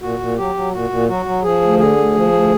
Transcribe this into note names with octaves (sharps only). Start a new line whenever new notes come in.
A#2 F#4
A#2
F#3 G4
F#3
A#2 F#4
A#2
F#3 F#4
F#3
F3 G#4
D2
D3 G#4
D2
F3
D2